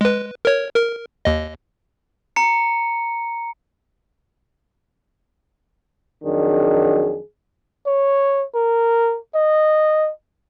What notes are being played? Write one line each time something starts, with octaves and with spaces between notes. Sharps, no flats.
G#3 B4
A#4 C#5
A#4
D#2 D#5
A#5 C#7
F2 D#3 F#3 D4 G#4
C#5
A#4
D#5